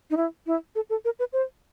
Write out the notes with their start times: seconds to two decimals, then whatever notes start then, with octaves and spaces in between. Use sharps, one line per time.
0.10 D#4
0.17 E4
0.46 E4
0.75 A4
0.90 A4
1.05 A#4
1.19 B4
1.33 C5